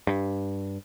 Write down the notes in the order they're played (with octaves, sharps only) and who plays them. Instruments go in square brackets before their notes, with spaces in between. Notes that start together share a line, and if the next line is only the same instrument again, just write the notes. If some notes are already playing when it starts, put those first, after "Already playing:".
[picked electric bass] G2